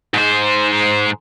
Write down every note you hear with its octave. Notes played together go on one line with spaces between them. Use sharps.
G#2 C5